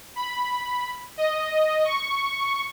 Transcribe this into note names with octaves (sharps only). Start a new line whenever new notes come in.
B5
D#5
C#6